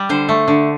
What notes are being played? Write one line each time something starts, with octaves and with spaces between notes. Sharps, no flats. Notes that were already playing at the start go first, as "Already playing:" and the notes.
Already playing: G3 D5
D3 C5
A3
D3